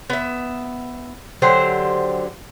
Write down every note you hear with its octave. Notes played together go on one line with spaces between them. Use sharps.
B3 E5
D3 F#3 G4 C5